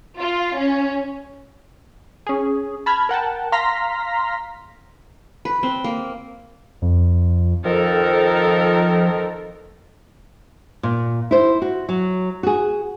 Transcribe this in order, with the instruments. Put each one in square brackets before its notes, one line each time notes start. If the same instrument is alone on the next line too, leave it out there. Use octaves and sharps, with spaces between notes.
[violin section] F4
C#4
[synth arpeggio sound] C#4 G#4
A5 B5 F6 G#6
A#4 F#5 G5 A5
F5 A#5 C6 F6 A#6 B6
[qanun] B4
C4
A#3
[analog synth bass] F2
[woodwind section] F2 D#3 [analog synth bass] F3 [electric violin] A4 A#4
[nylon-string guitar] A#2
E4 C5
F#4
F#3
F#4 G#4